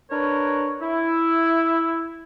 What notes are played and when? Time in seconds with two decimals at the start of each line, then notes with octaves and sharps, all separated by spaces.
0.10 D4 A#4 B4 C#5
0.81 E4